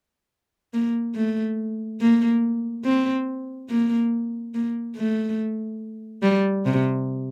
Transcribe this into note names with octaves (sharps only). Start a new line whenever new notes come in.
A#3
A3
A#3
C4
A#3
A#3
A3
G3
C3